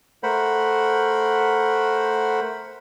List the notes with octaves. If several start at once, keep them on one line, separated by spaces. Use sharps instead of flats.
A3 A#4 C5 F#5 B5